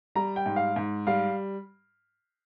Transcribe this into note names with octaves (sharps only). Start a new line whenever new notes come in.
G3 A#5
G5
G#2
F5
G#2
G3 F5